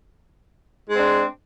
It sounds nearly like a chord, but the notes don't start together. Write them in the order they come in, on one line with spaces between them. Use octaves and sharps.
G#3 C4 D4